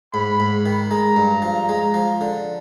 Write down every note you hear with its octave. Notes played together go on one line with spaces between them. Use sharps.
G#2 B5
G#2
D#3
G#3 A#5
G2
F3
G#3
F3
D3